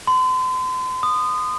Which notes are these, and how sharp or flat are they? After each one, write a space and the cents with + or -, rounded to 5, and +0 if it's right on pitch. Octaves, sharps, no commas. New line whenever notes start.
C6 -40
D#6 -20